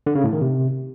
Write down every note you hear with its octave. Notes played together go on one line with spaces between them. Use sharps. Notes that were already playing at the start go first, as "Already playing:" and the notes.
D3
C#3
A2
D#3
C3